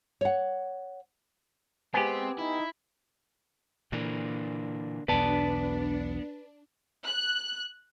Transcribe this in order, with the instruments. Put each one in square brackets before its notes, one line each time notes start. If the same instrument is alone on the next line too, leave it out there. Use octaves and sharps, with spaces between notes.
[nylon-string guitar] C#5 F#5
[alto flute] G#3 [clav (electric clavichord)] B3 G4 [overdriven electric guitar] C4 C5 [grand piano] G#5
[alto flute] D#4 [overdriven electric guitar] E4
[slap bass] A#2 E3 [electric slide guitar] D3 A#3 D4
[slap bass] B1 E2 B2 [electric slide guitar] B3 [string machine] D4 [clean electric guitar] B4 D5 A5
[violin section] F#6